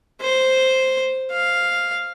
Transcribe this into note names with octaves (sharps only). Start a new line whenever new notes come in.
C5
F5